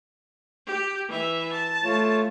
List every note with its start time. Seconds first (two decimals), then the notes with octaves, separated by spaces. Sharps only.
0.66 G4
1.08 E3 E5
1.53 A5
1.85 A3 F4 C#5